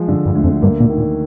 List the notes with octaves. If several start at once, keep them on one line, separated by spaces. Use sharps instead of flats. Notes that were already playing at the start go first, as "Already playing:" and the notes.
Already playing: F3 G#3
G2 D3
G2
D2
F2
G2 A#3
A#2
D#3
A#2